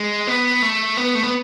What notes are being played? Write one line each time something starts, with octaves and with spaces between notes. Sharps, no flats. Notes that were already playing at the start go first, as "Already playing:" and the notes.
Already playing: G#3
B3
A3
B3
A3
B3